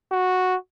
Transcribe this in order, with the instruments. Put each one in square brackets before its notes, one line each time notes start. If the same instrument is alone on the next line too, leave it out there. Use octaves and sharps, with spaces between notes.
[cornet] F#4